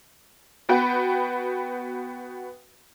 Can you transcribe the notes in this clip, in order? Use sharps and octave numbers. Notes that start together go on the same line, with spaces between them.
B3 F#4 B4 G5 B5